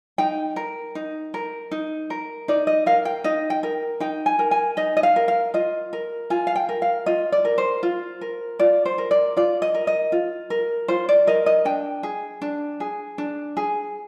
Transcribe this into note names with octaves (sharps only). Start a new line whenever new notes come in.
D#4 G5
A#4
D#4
A#4
D#4
A#4
D#4 D5
D#5
A#4 F5
G5
D#4 D#5
G5
A#4
D#4 G5
G#5
A#4
G#5
D#4 D#5
D#5
F5
A#4
F5
F4 D#5
A#4
F4 G#5
F5
G5
A#4
F5
F4 D#5
D5
A#4
C5
F4
A#4
F4 D5
C5
A#4
D5
F4 D5
D#5
A#4
D#5
F4
A#4
F4 C5
D5
A#4 D#5
D#5
D4 G5
G#4
D4
G#4
D4
G#4